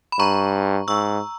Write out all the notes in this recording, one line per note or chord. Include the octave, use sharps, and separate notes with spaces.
B5
G2 A#5 C#6
G#2 C#6 E6